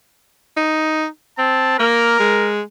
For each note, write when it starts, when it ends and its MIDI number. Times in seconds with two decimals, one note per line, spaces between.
0.57 1.07 63
1.38 1.79 60
1.38 1.74 81
1.79 2.18 58
1.79 2.51 70
2.20 2.61 56